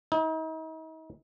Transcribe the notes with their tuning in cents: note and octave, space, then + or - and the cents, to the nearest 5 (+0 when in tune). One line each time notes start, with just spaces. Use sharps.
D#4 +40